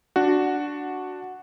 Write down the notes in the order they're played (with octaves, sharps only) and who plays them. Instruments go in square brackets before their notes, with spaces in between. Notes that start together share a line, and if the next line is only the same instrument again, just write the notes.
[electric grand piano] D4 F#4